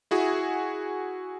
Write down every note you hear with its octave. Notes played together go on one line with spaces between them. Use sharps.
E4 F#4 G#4